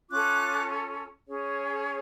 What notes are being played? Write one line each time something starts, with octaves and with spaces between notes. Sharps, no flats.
C#4 F4 A4 D6 F#6
C#4 G#4 C#5